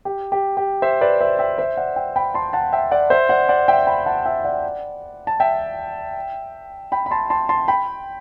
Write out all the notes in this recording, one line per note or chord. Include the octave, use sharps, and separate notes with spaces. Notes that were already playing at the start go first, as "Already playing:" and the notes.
G4
G4
G4
C5 E5
B4 D5
C5 E5
E5 G5
C5 E5
D5 F#5
E5 G5
G5 B5
A5 C6
F#5 A5
E5 G5
D5 F#5
C5 E5
D5 F#5
D5 F#5
E5 G5
G5 B5
F#5 A5
E5 G5
D5 F#5
A5
E5 G5
G5 B5
B5
A5 C6
A5 C6
A5 C6
G5 B5